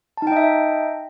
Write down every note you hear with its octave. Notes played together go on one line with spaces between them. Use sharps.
D#4 D#5 E5 G5 A5